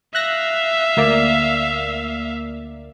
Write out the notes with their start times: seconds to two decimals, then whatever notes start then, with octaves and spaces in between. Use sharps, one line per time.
0.15 E5 F5 F#6 A#6
0.97 D2 A#3 D5